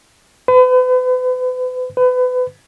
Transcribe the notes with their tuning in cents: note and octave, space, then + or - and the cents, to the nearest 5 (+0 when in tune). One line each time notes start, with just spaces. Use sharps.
B4 +40
B4 +30